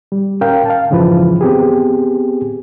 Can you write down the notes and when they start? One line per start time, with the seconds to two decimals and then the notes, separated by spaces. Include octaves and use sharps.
0.12 G3
0.41 C#4 A#4 F5 G5
0.66 F5 A5
0.90 F2 G#2 C#3 E3 F3 B4
1.41 B3 C4 G4 G#4